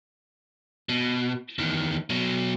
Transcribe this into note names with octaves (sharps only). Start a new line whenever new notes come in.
B2
E2 D#3
B2 F#3